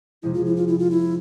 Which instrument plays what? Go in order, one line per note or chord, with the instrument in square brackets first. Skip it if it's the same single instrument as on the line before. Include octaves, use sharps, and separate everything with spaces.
[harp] F2 C3 F3 G#3 [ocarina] E4
[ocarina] F4
E4
F4
E4
F4
E4